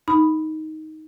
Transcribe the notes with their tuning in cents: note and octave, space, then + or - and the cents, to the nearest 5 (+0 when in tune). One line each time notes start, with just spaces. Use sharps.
D#4 +10 B5 +0